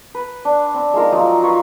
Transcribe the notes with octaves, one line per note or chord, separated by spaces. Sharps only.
B4
D4
C4
G#3 D#4 F4 A#4
F3 F#3 D#4 F4
F4 B4 C#5